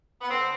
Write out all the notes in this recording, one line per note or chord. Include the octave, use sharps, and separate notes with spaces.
B3
D3 C4